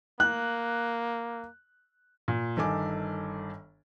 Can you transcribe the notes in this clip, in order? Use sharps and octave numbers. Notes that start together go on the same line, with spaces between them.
A#3 F#6
A#2
G1 D#3 A4 G#5 D6